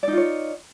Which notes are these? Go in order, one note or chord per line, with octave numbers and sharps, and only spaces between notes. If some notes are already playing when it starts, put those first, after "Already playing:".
D#4 F4 C#5 D5